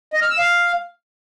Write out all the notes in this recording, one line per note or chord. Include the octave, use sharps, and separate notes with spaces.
D#5
F6
E6
F5